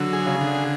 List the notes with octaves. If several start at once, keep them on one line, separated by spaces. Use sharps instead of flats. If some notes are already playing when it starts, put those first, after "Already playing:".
Already playing: D3 F#3
G#4
C#3
D3